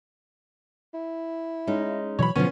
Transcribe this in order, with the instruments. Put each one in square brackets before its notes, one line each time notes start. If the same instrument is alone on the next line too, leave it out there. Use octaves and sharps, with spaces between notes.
[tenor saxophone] E4
[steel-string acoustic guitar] G#3 C#4 D#4
[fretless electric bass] B2 E3 F#3 [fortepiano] C#5 B5
[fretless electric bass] B2 D3 F#3 [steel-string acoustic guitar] F3 B3 [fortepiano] C#4